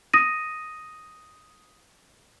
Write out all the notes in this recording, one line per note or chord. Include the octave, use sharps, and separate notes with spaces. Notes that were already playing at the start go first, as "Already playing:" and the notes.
D#6 A#6 D#7